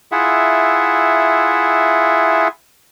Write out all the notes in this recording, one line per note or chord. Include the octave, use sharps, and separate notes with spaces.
E4 F4 G#4 E5 F#5